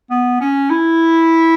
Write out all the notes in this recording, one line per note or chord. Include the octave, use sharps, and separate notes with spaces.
B3
C#4
E4